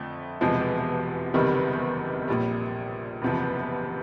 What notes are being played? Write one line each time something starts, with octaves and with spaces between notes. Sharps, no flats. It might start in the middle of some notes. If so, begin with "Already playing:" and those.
Already playing: F2 D3 A3
E1 E2 C3 F3 G#3
F#1 E2 C3 D#3 G3
A#1 A#2 G3
F#1 E2 C3 F3